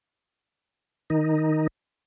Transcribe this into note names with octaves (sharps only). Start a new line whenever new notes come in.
D#3 D#4